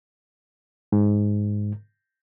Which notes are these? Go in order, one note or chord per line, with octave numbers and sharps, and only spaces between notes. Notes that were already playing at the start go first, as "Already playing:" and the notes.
G#2